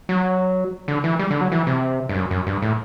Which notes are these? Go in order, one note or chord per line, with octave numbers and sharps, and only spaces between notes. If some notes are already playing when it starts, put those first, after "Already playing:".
F#3
D3
E3
G3
D3
F#3
E3
C3
G2
F#2
F#2
G2
A2